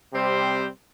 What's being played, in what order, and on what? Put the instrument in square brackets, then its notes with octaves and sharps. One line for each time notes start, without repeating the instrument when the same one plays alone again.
[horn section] C3 G3 C4 G4 C5